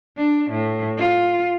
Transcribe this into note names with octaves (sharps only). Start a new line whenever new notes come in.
D4
A2
F4